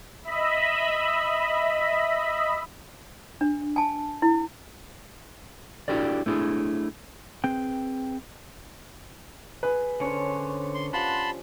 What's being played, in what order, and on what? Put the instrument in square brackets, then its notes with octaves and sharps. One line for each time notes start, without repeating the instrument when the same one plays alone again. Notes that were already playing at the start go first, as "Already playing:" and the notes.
[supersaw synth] D#5 E5 B5
[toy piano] D4
G#5 A5
E4
[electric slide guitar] D4 E4 F#4 G4 A4 D5
A3 D4 E4 G#4
C4 G#4 B4 G5
[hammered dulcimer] G#4 [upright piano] B4
[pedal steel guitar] D3 C#5 [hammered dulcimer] C#4 D4 C5
[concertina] C6
[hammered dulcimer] F3 G4 [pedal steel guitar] F#5 [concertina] A5 B5 C6